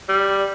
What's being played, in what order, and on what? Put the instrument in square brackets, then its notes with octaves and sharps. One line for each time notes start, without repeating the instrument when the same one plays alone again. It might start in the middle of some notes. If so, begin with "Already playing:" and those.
[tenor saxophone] G3